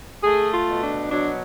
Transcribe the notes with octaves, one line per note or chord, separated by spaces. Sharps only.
A3 G#4
F4
B2
D4
F#3 D4